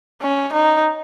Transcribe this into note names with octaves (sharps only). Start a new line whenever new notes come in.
C#4
D#4